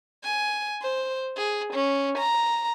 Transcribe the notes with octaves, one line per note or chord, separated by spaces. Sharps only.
G#5
C5
G#4
C#4
A#5